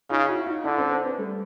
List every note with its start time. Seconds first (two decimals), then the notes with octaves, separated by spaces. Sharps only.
0.10 C#3 D#4 F4
0.29 E4 F#4
0.46 D#4 F4
0.64 D3 D4 E4
0.78 C4 D4
0.92 C4 D4
1.04 B3 C#4
1.18 G3 A3